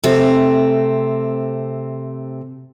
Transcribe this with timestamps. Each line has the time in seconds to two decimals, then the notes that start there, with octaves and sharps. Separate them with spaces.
0.04 C3 A3 C4